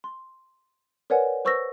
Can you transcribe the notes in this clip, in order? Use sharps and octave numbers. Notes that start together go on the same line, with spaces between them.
C6
A#4 B4 C#5 D5 F#5 G#5
B4 C5 C#6 E6 G6 A#6